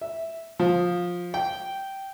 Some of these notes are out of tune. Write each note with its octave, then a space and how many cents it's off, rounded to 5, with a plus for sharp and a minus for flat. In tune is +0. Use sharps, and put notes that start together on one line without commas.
E5 -5
F3 +15
G5 -10